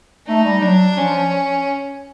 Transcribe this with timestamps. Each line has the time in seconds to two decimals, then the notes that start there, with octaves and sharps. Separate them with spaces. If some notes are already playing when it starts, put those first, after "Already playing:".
0.27 A3 D#4
0.45 G3
0.61 F#3 D4
0.96 F3 C#4